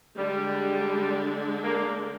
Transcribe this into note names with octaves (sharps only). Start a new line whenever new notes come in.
D3 G3 G#3 D4
A#3